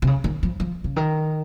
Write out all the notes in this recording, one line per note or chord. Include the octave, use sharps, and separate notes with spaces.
C3
C#3
D#3
F3
F3
C#3
D#3